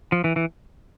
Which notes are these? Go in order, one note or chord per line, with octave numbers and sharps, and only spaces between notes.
F3
E3
E3